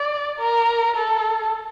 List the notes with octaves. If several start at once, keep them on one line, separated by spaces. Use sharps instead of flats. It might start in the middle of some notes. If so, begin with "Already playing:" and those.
Already playing: D5
A#4
A4